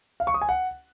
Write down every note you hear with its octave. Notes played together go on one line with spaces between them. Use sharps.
F5
C#6
D#6
G#5
F#5